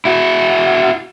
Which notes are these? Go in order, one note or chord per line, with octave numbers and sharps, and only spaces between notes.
E4 F#4